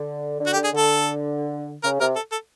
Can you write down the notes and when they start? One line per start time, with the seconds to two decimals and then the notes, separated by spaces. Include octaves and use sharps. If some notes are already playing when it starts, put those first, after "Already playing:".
Already playing: D3
0.40 D3
0.47 F#4
0.53 G4
0.57 D3
0.64 G#4
0.73 D3 A4
1.83 C#3 A#4
2.00 C3 A#4
2.16 A4
2.32 A4